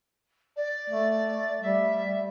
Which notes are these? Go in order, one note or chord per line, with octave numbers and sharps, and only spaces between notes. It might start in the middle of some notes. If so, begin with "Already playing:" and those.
D5
A3
G3 E5